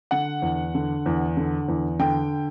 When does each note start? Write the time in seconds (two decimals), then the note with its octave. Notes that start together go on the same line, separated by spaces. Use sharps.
0.11 D3 F#5
0.42 E2
0.75 D3
1.06 E2
1.37 D3
1.68 E2
1.99 D3 G5